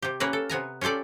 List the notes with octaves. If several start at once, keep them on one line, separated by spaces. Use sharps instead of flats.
C3 G4
A#3 C#4 A#4 B4
A4
C3 B3 G#5 A#5
C#4 F4 G4 A4 D5